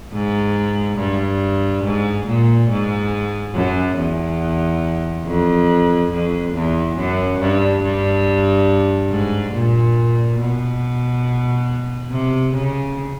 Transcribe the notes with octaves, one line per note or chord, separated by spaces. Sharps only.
G#2
G2
G#2
A#2
G#2
F#2
E2
F2
F2
E2
F#2
G2
G2
G#2
A#2
B2
C3
C#3